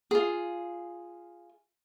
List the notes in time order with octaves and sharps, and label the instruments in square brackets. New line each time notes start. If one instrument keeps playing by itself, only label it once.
[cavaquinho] F4 G#4